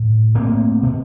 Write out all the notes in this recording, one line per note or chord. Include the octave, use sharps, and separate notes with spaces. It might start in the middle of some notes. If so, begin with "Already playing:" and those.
Already playing: A2
A2 A#3 C4
B2